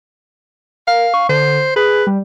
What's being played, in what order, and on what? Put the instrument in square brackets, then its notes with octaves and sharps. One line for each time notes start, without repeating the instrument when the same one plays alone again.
[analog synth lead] A#4 [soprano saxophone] F5
[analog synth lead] C#6
[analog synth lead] D3 [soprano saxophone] C5
[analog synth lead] G#4 [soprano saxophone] B4
[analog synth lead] G3